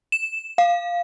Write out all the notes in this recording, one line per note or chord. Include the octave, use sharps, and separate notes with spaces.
E7
F5